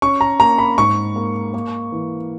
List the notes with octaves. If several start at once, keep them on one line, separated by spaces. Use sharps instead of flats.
C#4 C#6
A#5
A#3 A#5
B5
G#2 C#6
A#3
A#3
E3